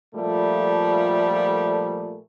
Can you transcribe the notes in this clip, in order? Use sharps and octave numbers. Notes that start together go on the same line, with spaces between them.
A#2 F3 G3 A3